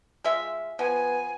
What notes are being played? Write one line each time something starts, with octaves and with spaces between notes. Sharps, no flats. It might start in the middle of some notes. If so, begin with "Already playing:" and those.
G#3 F4 E5
F3 B3 G#5